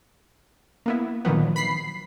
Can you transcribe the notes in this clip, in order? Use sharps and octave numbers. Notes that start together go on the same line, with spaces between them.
A#3 B3 E4
A#2 D3 D#3 F3 F#3 B3
B5 B6 C7